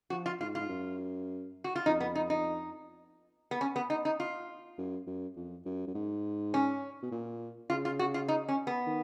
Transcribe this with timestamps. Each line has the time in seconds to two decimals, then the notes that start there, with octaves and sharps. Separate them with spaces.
0.10 F3 F#4
0.26 F4
0.40 G#2 F4
0.55 F4
0.61 G#2
0.69 F#2
1.64 F#4
1.76 F4
1.86 F2 D#4
2.00 B3
2.15 D#4
2.30 D#4
3.51 B3
3.61 C#4
3.76 B3
3.90 D#4
4.05 D#4
4.20 F4
4.78 F#2
5.07 F#2
5.36 F2
5.66 F#2
5.87 F#2
5.94 G#2
6.54 C#4
7.02 B2
7.12 A#2
7.70 C#3 F4
7.85 F4
7.99 F#4
8.14 F4
8.28 D#4
8.49 C#4
8.67 B3
8.87 D#3